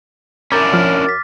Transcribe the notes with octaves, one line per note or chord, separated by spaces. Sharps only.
F#2 C#4 D4 E4 A#5 D6 G6 A6
F3 F6
D6 A6 B6